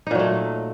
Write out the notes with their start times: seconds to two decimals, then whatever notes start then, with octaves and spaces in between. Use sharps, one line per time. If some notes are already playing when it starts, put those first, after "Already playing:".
0.07 D#4
0.11 A#2
0.15 F#3
0.19 A3